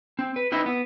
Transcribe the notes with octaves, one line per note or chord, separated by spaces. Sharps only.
C4
B4
C4 D#4 E4 B4 D#5 E5
B3